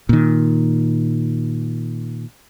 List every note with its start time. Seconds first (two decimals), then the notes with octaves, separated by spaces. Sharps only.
0.09 A#2 D#3